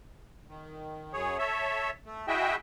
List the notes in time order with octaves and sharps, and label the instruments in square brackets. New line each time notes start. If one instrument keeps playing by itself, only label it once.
[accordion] D#3
F#2 G#4 C#5
A4 C#5 E5
A3
E4 F#4 G#4 D#5 E5 G5